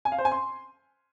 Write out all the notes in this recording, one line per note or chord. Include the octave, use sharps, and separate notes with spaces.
G#5
F5
C5
G#5
C6